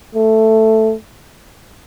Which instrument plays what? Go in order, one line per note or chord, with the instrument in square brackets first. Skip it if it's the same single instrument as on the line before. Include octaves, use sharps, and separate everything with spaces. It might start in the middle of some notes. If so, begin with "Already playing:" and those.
[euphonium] A3